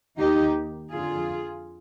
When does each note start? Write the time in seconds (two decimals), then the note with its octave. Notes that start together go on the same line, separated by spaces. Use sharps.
0.19 D#2 D#3 D#4 G4
0.92 F2 D3 F4 G#4